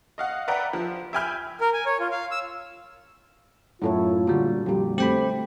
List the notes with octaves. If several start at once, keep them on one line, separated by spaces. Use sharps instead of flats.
D#5 F5 F#5
B4 D5 E5 F#5 G5 A#5
F3
E5 G5 G#5 B5 F6 G6
A#4
G#5
C#5
F4
F5
E6
F#2 A2 E4 F4 A4 C#5
A#2 D3 G3 F#4
F2 A#2 G3 G4
A3 C4 G4 G5 B5